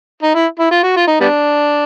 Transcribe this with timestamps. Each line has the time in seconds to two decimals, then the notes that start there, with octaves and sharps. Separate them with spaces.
0.23 D#4
0.35 E4
0.60 E4
0.71 F4
0.83 F#4
0.96 F4
1.08 D#4
1.20 G3 B3 D4